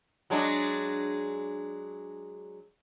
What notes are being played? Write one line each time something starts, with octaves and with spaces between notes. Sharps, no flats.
F#3 G#3 D4